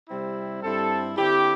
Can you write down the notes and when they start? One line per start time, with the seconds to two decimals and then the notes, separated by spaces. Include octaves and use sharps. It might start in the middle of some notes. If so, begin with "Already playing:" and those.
0.09 C3 G3 C4 E4
0.63 G2 G3 C4 E4 A4
1.17 D3 C4 E4 G4